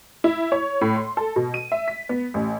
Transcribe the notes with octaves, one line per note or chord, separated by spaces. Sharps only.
E4
C#5
A2
C6
A4
B2
D#7
E5
B6
B3
A1